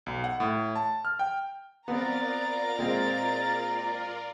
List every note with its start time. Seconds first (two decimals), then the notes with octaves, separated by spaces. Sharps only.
0.06 B1
0.24 F#5
0.40 A2
0.76 A5
1.05 F6
1.19 G5
1.88 B3 C4 F4 A#4 D5 A#5 A6
2.79 A#2 G#3 C4